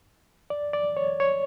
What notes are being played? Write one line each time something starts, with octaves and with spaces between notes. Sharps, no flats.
D5
D5
C#5
C#5